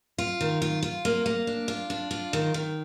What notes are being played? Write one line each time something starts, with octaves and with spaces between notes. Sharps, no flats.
F4
D#3
F4
F4
A#3
A#3
D4
F4
D4
F4
D#3
D#3